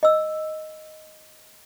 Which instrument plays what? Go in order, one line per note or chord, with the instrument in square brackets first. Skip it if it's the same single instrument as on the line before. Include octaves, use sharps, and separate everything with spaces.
[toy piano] D#5 E6